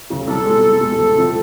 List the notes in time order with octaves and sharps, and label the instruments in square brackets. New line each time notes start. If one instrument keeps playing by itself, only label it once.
[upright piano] D2 C#3 F#3
[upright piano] C2 [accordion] A4
[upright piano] B2 G#3
C2
B2 G#3
D2
C3 F3 A3